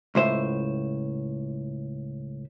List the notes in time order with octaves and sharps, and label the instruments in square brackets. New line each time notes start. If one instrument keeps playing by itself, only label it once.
[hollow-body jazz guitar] C#2 A2 C5 E5